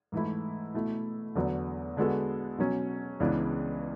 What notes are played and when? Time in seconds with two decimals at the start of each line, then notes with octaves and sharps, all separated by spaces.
0.12 G#2 E3 A3 E4
0.74 B2 A3 E4
1.35 E2 D3 F#3 B3
1.97 D3 G#3 B3 F#4 A4
2.58 B2 F#3 C#4
3.20 C#2 C#3 E3 B3 D4